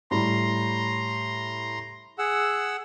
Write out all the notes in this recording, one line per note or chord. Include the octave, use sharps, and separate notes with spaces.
A2 G3 A#5 C6
G#4 F#5 E6